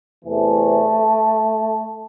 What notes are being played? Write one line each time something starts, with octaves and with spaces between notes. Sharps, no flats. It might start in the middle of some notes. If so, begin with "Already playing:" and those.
E2 C3 E3 A3